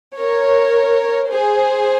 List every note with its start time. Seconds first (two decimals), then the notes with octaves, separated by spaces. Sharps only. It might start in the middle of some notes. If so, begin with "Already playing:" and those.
0.19 A#4 C#5
1.32 G#4 C5